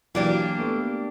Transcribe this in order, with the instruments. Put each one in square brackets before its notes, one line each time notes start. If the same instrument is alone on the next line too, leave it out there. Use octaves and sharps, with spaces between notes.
[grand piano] E3 F#3 [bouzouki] A#3 D4 G4
[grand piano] A3 B3